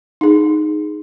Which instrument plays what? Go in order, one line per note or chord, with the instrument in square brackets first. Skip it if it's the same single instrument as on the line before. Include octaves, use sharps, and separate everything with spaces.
[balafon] D#4 G#4